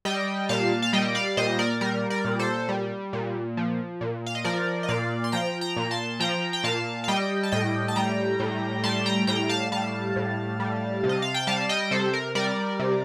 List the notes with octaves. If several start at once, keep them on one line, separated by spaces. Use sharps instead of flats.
G3 D#5 G5
A#2 F5 A5
F5
G3 D#5 G5
D5 F5
A#2 C5 D#5
A#4 D5
G3 A#4
A#4 D5
A#2
A4 C5
G3
A#2
F3
A#2
F5
D#5
F3 A#4 D5
D#5
A#2 D5 F5
C6
F3 G5 A#5
G5 A#5
A#2
A5 C6
F3 G5 A#5
G5
A#2 F5 A5
F5
G3 D#5 G5
A5
A2 D#5 G5
A5
G3 G5 A#5
A2
G3 A5 C6
G5 A#5
A2 G5 A#5
F5 A5
G3 F5 A5
A2
G3
C3
D#5
F5
G5
G3 F5 A5
D#5 G5
C3 A4 C5
A#4
G3 A#4 D5
C3